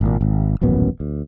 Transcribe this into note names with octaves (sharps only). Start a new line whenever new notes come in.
G#1 A#2
G#1
D#1 A1 F#2 B3
D2